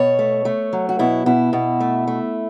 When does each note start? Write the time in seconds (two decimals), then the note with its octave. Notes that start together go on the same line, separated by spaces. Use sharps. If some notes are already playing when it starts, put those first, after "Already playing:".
Already playing: B2 C#5
0.19 A3
0.45 A3
0.73 F#3
0.89 F#4
0.99 B2 E4
1.26 B2 E4
1.53 B2
1.80 A3
2.07 A3